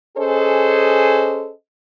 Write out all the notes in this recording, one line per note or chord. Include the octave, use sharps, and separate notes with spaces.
C#4 G#4 A4 C5 D#5